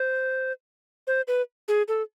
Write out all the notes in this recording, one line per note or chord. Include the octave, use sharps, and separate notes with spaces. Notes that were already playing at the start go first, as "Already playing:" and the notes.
Already playing: C5
C5
B4
G#4
A4